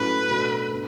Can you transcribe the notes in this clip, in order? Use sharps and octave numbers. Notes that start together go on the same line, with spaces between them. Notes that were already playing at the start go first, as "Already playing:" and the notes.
Already playing: A2 F#3 A3 C#4 B4
B2 A3 D4 A4
B3 D4